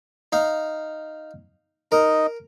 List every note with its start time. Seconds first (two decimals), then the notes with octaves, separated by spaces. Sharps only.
0.32 D#4 F5
1.92 D#4 A#4 D#5